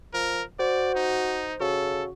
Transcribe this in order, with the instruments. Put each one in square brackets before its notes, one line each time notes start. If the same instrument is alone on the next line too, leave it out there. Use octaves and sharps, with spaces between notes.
[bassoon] F3 [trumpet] A#4
[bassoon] F#4 [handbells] C5 [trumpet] D5
[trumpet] D#4
[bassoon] C#3 [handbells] F#4 [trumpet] A4